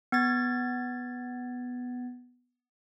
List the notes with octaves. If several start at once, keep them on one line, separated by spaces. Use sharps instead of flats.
B3 G#6 A6